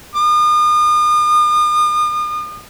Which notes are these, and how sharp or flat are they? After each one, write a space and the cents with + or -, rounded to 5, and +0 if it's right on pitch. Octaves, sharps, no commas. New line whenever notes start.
D#6 -40